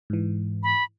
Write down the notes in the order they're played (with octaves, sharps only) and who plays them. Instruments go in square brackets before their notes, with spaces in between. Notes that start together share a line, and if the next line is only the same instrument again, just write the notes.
[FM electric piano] G#2 E3
[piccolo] B5